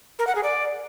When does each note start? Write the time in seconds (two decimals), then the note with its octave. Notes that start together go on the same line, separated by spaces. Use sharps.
0.19 A#4
0.27 F#5
0.35 G#4
0.43 D5